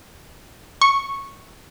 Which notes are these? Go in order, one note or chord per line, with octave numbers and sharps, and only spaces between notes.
C#6